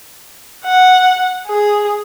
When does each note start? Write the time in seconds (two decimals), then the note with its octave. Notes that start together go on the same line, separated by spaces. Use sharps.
0.65 F#5
1.48 G#4